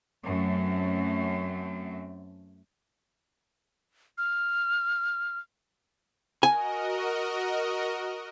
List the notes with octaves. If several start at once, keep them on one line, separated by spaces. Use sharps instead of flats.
F#2 A3 C4
F6
F#4 A#4 D#5 G#5